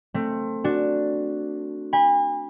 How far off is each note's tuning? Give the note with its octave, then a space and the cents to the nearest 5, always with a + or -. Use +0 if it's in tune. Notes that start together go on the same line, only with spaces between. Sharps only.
A3 +20 C4 +20
D4 +0 F#4 +0
G#5 -40 B5 -15